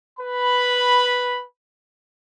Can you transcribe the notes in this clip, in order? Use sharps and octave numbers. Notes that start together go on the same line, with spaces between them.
B4 B5